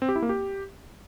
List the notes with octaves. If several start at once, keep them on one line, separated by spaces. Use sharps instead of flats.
C4
G4
E4
A#3
G4